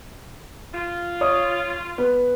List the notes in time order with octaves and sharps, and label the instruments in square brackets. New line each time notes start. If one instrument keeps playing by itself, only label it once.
[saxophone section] F4
[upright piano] C#5 D#6
B3 B4